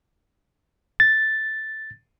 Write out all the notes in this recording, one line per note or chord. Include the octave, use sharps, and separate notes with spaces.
A6